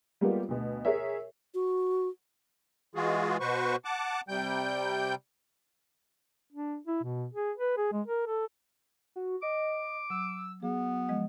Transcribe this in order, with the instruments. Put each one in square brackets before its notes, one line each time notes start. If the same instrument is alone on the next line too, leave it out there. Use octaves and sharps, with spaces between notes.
[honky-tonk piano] G3 G#3 A#3 B3 F4 G4
D2 B2
G#4 A#4 C#5 E5
[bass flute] F#4
[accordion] E3 G#3 F4 F#4 G#4
B2 F#4 B4 C5 C#6
F#5 A5 D6
C3 G3 G5 G6
[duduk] D4
E4
B2
G#4
B4
G#4
G#3
A#4
A4
[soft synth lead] F#4
[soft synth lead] D#5 [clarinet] D6
[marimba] F#3 [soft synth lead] E6
[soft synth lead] F#3 [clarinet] B3 [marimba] G#4
[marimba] F3 G#3 D#5